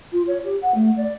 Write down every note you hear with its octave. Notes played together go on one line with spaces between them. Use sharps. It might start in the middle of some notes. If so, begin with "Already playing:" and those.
F4
C#5
G4
F#5
A3
D5